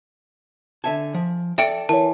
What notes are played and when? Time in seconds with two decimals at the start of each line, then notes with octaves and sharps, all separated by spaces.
0.84 D3 E5 G#5 A5
1.14 F3
1.58 A4 D5 E5 G5 D7
1.89 E3 A#4 C#5 A5